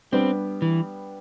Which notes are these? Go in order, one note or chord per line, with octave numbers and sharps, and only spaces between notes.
G3 B3 C4 D4 G4
E3